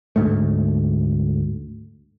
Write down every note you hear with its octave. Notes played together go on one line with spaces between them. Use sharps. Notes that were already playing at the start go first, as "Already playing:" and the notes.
D2 G#2 A3